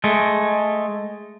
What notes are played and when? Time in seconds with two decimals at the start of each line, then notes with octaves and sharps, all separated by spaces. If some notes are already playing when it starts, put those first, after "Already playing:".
0.04 G#3 A3